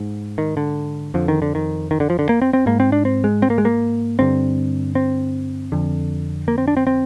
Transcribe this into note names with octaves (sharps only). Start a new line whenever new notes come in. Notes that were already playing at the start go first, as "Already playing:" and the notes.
Already playing: G#2
D#3
D3
F2 D3 F3
D#3
D3
D#3
D#3
D3
F3
D3
A#3
C4
C4
G#2 A#3
C4
D4
C4
G#3
C4
A#3
G#3
A#3
G2 D3 C4
C4
F2 D3
A#3
C4
D4
C4
C4